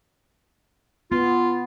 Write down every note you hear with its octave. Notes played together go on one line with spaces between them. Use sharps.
B3 F4